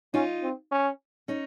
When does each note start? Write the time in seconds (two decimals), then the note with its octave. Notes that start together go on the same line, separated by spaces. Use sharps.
0.14 C#4 D#4 F4
0.43 C4
0.72 C#4
1.28 C#4 D#4